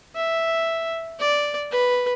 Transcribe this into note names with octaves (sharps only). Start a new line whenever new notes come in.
E5
D5
B4